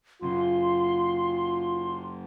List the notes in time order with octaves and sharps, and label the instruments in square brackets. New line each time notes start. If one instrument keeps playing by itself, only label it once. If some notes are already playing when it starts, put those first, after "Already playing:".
[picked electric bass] F#2 C#3 [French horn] F4 [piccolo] C6